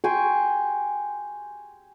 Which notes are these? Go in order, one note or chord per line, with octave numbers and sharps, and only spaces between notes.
G5 G#5 C6 C#6